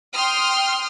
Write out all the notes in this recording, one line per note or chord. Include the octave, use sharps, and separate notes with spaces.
G5 C6 D#6 F6